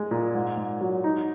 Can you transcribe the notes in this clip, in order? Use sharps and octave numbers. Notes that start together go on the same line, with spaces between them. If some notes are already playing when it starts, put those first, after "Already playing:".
Already playing: G#3
A#2
G#2
G#2
F#3
D#4